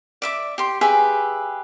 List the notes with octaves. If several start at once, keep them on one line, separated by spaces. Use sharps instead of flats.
D5 E5 D6
G4 C6
G4 G#4 B4 E5